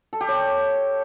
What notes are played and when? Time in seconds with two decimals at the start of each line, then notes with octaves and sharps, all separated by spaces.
0.13 A4
0.21 G4
0.28 C#5